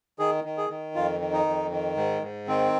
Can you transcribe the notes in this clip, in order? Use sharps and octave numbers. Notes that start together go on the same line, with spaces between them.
D#3 G#4
D#3
G#4
D#3
F2 F4
D#3
D#4
F2
D#3
G#2
G#2
D#3 C4